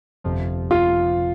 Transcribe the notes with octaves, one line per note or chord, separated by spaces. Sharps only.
G1 F2 C3 F3
F4